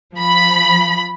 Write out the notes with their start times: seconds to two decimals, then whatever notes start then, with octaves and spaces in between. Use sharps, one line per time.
0.16 F3 B5